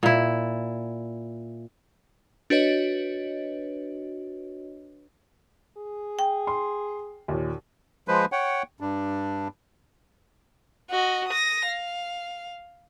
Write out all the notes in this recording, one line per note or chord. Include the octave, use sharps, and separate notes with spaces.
A#2 E4
D4 F#4 B4 C#5 D#5
G#4
G5
C6
D#2 A#2
F3 G#3 B4 C5
C#5 F#5 G5
G2 D4
F#4 D#5
D#6 A#6
F5